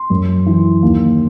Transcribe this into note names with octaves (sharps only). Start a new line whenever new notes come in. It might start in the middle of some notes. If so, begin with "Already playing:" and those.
Already playing: C6
F#2
E3
D#2